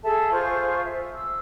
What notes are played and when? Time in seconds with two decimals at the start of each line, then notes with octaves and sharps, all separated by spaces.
0.03 G#4 A4 E5 A5
0.31 F4 G#4 C5 C#6
0.82 E5
1.13 E6